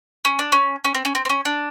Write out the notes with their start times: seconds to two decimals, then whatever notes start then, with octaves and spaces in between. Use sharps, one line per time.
0.25 C#4
0.39 D4
0.52 C#4
0.84 C#4
0.95 C4
1.05 C#4
1.15 C4
1.25 C4
1.29 C#4
1.45 D4